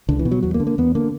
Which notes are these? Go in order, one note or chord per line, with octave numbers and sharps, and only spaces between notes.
C#2 D3
E3
B2
F#3
E2 F#3
A#3
D3
A#3
E2 B3
D3 A#3